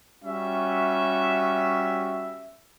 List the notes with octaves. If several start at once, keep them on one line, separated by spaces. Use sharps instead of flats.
G3 C#4 F#4 E5